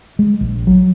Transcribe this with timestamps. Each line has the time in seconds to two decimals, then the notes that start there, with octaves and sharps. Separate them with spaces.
0.19 G#3
0.41 A#1
0.67 F#3